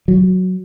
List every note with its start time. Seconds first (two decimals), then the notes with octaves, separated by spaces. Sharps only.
0.08 F#3